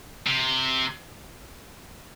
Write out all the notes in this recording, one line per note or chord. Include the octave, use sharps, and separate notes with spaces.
C3